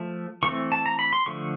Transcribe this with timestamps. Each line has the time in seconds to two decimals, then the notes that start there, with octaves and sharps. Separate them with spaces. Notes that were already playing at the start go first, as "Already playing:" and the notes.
Already playing: F3 A3
0.43 E3 A3 C4 C#6
0.72 A5
0.86 A#5
0.99 B5
1.13 C6
1.26 D3 F3 A3 C#6